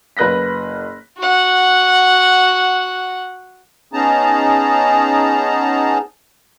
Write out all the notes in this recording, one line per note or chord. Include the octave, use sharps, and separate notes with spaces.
F#1 B4 F#6 A#6 B6
F#4 F#5
B3 C#4 D#4 G#4 A5 A#5